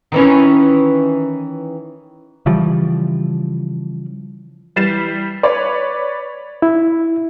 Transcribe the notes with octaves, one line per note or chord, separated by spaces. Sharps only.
D#3 E3 C#4
C#3 E3 F3 G3
E3 G3 A6 C7 E7
B4 C#5 D5
E4